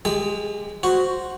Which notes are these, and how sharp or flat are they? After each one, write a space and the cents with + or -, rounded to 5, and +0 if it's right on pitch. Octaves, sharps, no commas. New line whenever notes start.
G#3 +0 G4 +25 G5 +45
F#4 +0 C5 +0